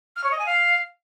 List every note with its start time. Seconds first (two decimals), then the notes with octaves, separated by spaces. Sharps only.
0.16 F6
0.23 C#5
0.31 D#5
0.38 G#5
0.46 F5